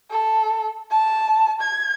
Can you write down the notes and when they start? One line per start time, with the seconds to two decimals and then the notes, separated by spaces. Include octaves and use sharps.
0.11 A4
0.92 A5
1.62 G#6